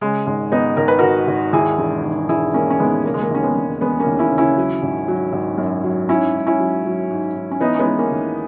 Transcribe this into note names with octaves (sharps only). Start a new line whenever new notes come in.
C#3 G#3
G#1 G#3
G#1 B3 D#4
G#1 A#4
B4
G#1 F#4 A#4
G#1
D#2 E4 G#4
E1
D#2
E1 E4 G#4
E1 A#3 C#4
C#4
D#2 G#3 B3
C#3 A#3
G#3
A#3
D#2 C#4
G#3 B3
E1
E1 G#3 B3
A#3 C#4
D#2
C#4 E4
C#3
C#4 E4
F#3
G#1
F#3
G#1
F#2
F#3
G#2 C#4 E4
G#2
C#4 E4
F#3
F#3
G#2
G#2
C#4
E3 B3 D#4
C#4
G#3 B3
E3
A#3 C#4
D#2